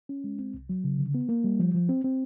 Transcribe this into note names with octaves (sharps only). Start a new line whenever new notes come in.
C#4
G#3
C4
C2
F#3
C#3
D3
B3
A#3
G3
F3
F3
C4
C4